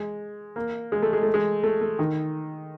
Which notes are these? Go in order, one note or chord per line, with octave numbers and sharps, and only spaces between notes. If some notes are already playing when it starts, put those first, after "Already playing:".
Already playing: G#3
A#3
G#3
A3
G#3
A3
G#3
A3
A3
D#3